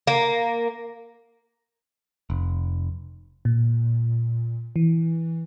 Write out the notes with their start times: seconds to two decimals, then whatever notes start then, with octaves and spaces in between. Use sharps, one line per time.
0.07 A#3
2.30 F1
3.45 A#2
4.76 E3